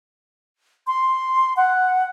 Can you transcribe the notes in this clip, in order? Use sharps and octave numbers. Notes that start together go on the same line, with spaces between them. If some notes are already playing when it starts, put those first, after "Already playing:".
C6
F#5